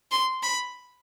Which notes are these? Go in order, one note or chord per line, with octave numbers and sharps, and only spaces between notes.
C6
B5